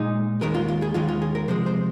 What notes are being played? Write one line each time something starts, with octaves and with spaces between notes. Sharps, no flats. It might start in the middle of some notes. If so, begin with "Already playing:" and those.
Already playing: A#2 G#3 D#4
D#2 D#3 G#3 A#4
F4
F4
G#4
D#2 D#3 G#3 F4
F4
G#4
A#4
C3 F3 G#3 C5
C5